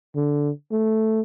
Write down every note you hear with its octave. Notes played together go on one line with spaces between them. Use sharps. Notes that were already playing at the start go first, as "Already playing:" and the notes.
D3
A3